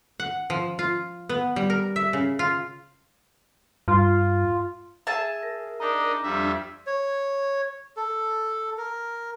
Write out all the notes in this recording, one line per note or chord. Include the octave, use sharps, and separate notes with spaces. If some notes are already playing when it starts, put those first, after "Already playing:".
F#5
F3
F4
B3
G3
A#4
E5
C#3
F4
G2 F4
G#4 E5 A5 G#6 A6
A#4 A#6
D4 D#4 D#5 A#5 D6
F2 G3 D4 E5
C#5
A4
A#4